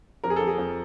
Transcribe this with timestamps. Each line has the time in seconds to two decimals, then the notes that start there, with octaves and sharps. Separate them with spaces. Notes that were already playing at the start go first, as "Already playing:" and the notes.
0.24 F2 A#4
0.30 G#4
0.36 F2 A4
0.47 G#4
0.58 F2